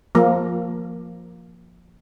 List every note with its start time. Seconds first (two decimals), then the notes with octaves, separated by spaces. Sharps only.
0.15 F3 A#3